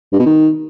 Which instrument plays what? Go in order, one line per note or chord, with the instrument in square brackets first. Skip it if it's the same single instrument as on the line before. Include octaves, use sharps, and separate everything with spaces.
[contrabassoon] G2
B2
D#3